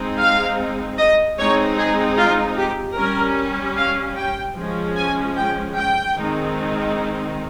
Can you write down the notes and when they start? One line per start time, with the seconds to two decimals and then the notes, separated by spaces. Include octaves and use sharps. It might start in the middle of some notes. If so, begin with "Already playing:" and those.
Already playing: G#3 C4 D#4
0.19 F5
0.98 D#5
1.38 G#3 C4 D#4 C#5
1.77 G#4
2.18 F4
2.57 G4
2.97 G3 C#4 A#4
3.77 F5
4.16 G5
4.56 F3 G#3 C#4
4.97 G#5
5.36 G5
5.76 G5
6.15 D#3 G#3 C4 D#4